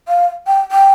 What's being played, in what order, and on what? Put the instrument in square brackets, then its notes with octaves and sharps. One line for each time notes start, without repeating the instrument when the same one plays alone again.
[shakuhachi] F5
G5
G5